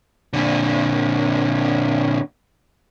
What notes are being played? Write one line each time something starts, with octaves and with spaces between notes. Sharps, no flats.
A#2 D3